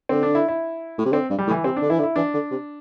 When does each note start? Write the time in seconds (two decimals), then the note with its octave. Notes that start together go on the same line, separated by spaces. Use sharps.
0.09 D3 C4
0.23 D4
0.35 E4
0.48 E4
0.98 A2
1.05 C3
1.13 D3 C4
1.30 G2
1.39 G3
1.47 A2
1.51 E3
1.64 C3 C4
1.77 D4
1.82 D3
1.90 E3 E4
1.99 D3
2.03 E4
2.16 E3 D4
2.34 D3
2.51 C3